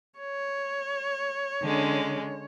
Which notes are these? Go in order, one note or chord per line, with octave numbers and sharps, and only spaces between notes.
C#5
D3 G#3 C#4